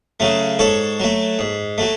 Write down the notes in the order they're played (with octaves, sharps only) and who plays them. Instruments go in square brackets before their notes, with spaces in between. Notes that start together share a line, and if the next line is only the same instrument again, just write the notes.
[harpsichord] C#3 F#3 A3
G#2 A4 C#5
F#3 A3
G#2
F#3 A3